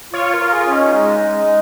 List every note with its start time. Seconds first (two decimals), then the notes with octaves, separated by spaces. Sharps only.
0.13 F4 C#5
0.34 A#4
0.40 F4
0.53 G#4
0.66 C#4
0.73 D#4
0.93 G#3
1.20 G#3
1.45 G#3